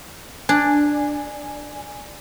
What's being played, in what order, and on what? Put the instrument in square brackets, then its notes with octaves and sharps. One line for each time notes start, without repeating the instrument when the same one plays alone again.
[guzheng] D4 [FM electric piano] G#5